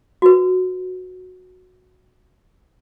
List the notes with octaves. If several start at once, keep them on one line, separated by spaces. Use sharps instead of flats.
F#4 B4